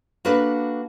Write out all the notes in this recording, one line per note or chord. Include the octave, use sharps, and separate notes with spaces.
A#3 D4 F#4 A4 B4